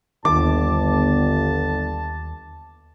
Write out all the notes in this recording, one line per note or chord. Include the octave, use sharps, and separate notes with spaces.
G1 D#2 A5 D6